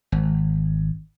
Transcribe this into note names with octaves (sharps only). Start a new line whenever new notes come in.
G#1